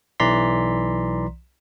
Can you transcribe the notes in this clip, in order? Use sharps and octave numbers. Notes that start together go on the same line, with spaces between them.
B1 E3 D5 A#5 C6 B6